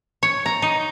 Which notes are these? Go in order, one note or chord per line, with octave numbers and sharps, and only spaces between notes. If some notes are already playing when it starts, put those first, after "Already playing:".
C#5
A#5
D#4